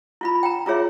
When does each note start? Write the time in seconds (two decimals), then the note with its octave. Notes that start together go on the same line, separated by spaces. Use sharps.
0.21 E4 F4 B5
0.43 G5 A#5
0.66 E4 F4 G#4 C#5 E5